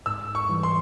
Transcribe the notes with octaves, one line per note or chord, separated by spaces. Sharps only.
G#2 E6
C#6
E3 G3
C6